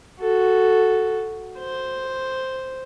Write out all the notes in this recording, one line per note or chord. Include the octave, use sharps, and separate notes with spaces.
F#4 A4
C5